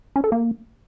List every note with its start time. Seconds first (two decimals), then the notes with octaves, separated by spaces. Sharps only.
0.16 C#4
0.24 A4
0.32 A#3